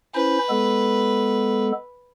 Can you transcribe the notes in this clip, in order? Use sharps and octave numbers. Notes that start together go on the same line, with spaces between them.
C#4 E4 B4 C5
G#3 B3 A4